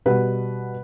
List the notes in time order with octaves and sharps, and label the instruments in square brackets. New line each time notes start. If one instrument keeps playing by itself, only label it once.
[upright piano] B2 G3 B3 B4